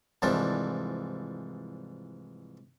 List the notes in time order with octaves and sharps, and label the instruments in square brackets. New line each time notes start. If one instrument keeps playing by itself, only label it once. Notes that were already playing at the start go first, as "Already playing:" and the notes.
[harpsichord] C2 G#2 E3 F3 D4 D5